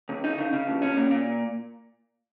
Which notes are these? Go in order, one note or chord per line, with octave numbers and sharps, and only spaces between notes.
C#2
D#4
C#3
C#3
D#2
C#4
A#2
A#2